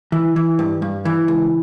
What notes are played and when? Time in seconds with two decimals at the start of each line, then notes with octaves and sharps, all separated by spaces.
0.12 E3
0.36 E3
0.59 G2
0.82 G2
1.05 E3
1.28 C#2